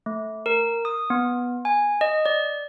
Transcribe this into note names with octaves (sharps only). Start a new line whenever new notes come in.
A3
A#4
D#6
B3
G#5
D#5
D5